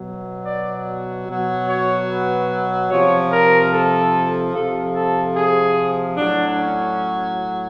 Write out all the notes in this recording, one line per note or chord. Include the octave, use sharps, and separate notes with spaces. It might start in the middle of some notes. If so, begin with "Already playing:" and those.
Already playing: B2 F#3
D5
B2 F#3
C#5
B4
C3 F3 C#5
A#4
A4
C3 F3 A4
A4
G#4
A2 F#3 D4
C#4